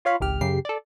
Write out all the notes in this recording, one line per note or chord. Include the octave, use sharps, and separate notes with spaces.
F4 C#5 F5 B5
G#1 C#2 G4 F6
F#2 C#3 G4 C7
A4 D5